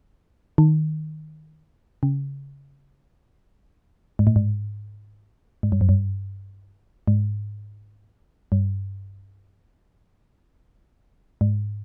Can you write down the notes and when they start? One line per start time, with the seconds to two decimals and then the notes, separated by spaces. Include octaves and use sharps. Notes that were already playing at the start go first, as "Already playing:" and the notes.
0.58 D#3
2.03 C#3
4.19 G#2
4.27 A2
4.36 G#2
5.63 G#2
5.72 G2
5.81 F#2
5.89 G2
7.08 G#2
8.52 G2
11.41 G#2